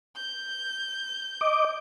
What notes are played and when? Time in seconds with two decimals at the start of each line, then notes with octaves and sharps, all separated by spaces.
0.16 G6
1.41 D#5 D6